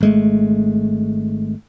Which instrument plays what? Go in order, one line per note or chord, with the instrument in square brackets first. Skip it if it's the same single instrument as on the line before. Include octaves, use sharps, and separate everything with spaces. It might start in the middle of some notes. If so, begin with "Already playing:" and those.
[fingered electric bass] G#1 G#3 A3